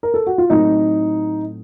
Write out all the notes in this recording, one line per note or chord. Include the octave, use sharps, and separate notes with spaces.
A#4
A4
F#4
F4
A2 F#3 A3 C4 D#4